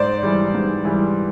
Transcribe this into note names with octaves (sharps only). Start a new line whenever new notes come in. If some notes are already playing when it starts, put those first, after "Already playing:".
Already playing: G#2 C5 D5
E3 G3
G#2
E3 G3